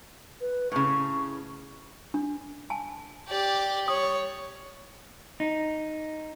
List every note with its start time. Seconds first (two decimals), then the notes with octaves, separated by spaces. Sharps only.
0.41 B4
0.72 A2 C#3 C#6
2.14 D4
2.70 G#5 A5
3.28 G4 D5
3.88 C#5 D#6
5.40 D#4